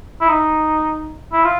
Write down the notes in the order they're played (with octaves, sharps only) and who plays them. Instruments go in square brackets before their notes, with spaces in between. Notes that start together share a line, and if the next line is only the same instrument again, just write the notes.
[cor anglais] E4
D#4
E4
F4